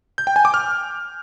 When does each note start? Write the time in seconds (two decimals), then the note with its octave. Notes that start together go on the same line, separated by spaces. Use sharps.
0.18 G6
0.27 G5
0.36 G#5
0.45 D6
0.54 F6